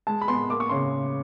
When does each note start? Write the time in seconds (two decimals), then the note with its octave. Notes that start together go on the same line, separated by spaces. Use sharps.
0.07 G#3 A5
0.22 B5
0.28 B3 C6
0.50 A#3 D6
0.60 C#6
0.69 C#3 C6